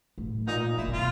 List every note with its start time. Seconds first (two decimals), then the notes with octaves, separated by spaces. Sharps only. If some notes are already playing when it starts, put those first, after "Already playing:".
0.18 A2
0.47 A#2 D#4
0.78 A#2 E4
0.88 B2 F4